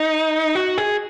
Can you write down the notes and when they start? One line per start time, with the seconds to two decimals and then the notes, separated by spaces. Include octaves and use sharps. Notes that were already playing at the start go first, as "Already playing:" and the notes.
Already playing: D#4
0.55 F#4
0.78 G#4